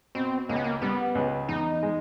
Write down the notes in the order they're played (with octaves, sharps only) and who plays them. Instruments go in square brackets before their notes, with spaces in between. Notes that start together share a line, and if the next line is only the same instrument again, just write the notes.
[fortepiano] B2 [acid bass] C4
[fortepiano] C#2 [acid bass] A#3
[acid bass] B3
A#3
[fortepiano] G3 [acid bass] B3
[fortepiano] C#2
[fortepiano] E2 [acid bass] D#4
[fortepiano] G#3